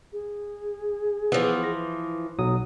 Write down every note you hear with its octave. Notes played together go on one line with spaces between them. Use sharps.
G#4
E3 F3 B3
A#6
B1 F#3 D#6